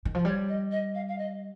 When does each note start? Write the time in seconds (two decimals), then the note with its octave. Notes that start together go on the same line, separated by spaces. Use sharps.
0.05 D#3
0.15 F3
0.25 G3 C#5
0.49 D#5
0.71 D#5
0.95 F5
1.08 F5
1.18 D#5